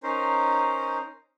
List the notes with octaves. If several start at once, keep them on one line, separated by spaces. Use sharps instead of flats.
C#4 D#4 A#4 C5